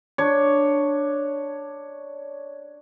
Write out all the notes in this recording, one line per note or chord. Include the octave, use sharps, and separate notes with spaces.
D4 C#5